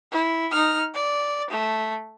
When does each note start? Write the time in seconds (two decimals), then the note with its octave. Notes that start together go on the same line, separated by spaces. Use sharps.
0.12 E4
0.51 D#4 F6
0.94 D5
1.50 A3